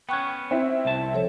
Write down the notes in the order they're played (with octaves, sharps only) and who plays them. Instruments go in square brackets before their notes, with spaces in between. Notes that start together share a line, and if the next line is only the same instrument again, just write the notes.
[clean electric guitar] B3 C#4 [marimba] G5 C#6 F#6
[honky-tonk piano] C4 E4
[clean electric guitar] C2 A5
[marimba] F3 A4 C#5